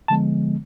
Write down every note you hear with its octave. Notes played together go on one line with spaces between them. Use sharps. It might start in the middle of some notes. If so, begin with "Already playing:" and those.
D3 F3 G#3 B3 A5